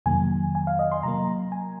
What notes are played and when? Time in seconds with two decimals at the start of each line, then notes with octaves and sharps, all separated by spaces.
0.06 F2 C3 D#3 F#3 A#3 G#5
0.55 G#5
0.67 F5
0.79 D#5
0.92 C6
1.03 C3 F#3 A#3 A#5
1.52 G#5